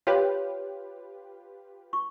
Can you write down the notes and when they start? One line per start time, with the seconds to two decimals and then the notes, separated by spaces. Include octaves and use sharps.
0.07 F4 G4 B4 C#5
1.93 C#6